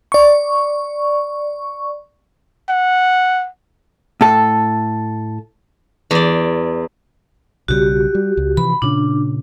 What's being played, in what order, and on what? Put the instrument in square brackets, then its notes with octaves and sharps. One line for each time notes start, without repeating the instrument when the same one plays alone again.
[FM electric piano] D5 C#6
[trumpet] F#5
[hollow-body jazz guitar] A2 A4
[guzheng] E2 D5
[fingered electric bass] B1 C#3 G3 [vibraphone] F#4 G4
[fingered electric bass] G3
C#2
[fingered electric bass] C3 E3 F3 [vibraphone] B5
[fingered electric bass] A#2 C#3 [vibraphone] D4